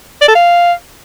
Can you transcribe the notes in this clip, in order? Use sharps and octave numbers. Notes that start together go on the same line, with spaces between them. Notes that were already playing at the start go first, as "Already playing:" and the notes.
D5
A4
F5